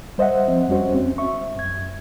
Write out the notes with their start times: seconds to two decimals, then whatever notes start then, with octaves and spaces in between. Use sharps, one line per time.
0.18 G3 C5 D#5 E5 F#5
0.48 F3 C4
0.68 F2 G3 C#4 F#4 C5
0.94 C4 C#4
1.18 E5 C#6
1.56 F#2 G#6